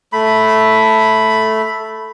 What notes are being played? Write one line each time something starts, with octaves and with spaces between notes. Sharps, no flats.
A3 B5